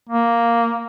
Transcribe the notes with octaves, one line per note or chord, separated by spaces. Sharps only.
A#3